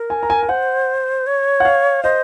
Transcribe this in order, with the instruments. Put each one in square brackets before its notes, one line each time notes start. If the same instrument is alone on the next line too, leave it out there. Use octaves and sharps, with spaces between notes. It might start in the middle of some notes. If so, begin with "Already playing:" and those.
Already playing: [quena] A#4
[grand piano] G#5
A#5
G#5
G#5
[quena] C5 [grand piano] F#5
[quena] C#5
[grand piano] F#5
F5
[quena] C5 [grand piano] D#5